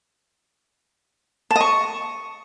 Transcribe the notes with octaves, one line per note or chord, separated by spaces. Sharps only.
A5
D#5
C#6